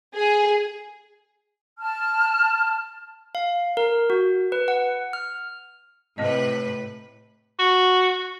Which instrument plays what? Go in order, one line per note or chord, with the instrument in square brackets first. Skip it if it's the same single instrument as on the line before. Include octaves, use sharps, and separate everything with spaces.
[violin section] G#4
[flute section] A5 F6
[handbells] F5
A#4
F#4
B4
F#5
F6
[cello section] A2 C3 B4 [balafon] A3 C4 D#5
[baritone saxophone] F#4